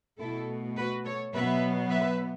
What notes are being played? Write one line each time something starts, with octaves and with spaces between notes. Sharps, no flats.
B2 A3 E4 A4
F#4 B4
A4 C#5
B2 F#3 B3 B4 E5
B4 E5